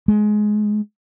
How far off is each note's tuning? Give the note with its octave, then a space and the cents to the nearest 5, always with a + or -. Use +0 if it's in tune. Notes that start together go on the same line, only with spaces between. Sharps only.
G#3 +20